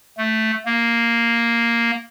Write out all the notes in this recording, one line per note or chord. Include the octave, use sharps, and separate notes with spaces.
A3
A#3